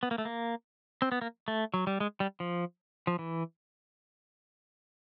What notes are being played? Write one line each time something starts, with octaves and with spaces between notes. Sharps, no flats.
B3
A#3
A3
A#3
C4
B3
A#3
A3
F#3
G3
G#3
G3
F3
F3
E3